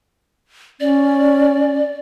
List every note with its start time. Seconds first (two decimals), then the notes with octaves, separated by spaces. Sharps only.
0.80 C#4 D5